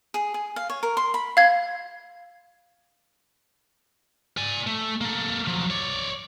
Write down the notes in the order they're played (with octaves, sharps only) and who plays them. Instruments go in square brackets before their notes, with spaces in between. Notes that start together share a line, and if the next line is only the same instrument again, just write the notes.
[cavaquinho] G#4
G#4
F5
C#5
A#4
C6
B5
[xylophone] F5 G#6
[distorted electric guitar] D5 G#5
A3
A#3 A4
F3 F#3
C#5 D5